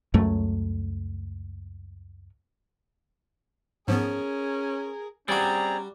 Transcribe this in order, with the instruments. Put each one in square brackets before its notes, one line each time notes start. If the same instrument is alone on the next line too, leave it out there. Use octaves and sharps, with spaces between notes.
[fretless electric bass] C#2 F#2 F#3 A3
[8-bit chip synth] G#2 F3 B3 [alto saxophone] C#4 [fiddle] G#4 A#4
[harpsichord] G3 F#4 [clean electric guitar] C4 G#4 D5 [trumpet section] C#4 A#5